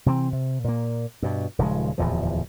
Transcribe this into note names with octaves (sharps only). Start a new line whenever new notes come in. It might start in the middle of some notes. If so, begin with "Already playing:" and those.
C3 E3 F3 C4
C3
A#2 A#3
G2 B2
D#1 C#3 F3 G#3
D1 E2 A#2 F3